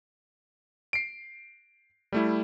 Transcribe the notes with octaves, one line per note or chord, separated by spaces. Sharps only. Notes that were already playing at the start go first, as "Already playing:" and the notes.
C7 D7
G3 A3 E4